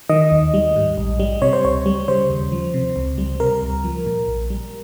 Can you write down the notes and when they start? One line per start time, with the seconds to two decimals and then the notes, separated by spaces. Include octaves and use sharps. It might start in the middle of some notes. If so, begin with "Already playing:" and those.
0.10 D#3 D#5
0.32 D#2
0.54 G3
0.76 G#2
0.98 A#1
1.20 G3
1.42 C3 C#5
1.53 C5
1.64 C#2 C#5
1.86 G3
2.08 C#3 C5
2.30 D#2
2.52 F3
2.74 C3
2.96 C#2
3.18 G3
3.40 C3 A#4
3.62 C#2
3.84 F3
4.06 A#2
4.28 A#1
4.50 G3